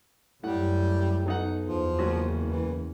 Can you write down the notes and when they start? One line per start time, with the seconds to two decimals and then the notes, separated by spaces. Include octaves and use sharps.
0.44 F#2 A2 G3 F#5
1.26 B1 F#3 D#4 F#5
1.66 E2 F3
1.99 F#1 F#3 C#4 F#4
2.47 E3